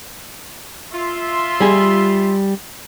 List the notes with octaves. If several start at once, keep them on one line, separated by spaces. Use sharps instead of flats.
F4 E5 C6
G3 G#4